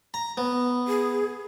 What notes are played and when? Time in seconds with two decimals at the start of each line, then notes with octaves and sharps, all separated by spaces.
0.14 A#5
0.37 B3
0.88 G#4